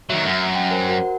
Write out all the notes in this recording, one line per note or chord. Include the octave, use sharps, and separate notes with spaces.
D#3 F#3 E5
F#2
G5
A#4 C5
F#4 A#4 F#5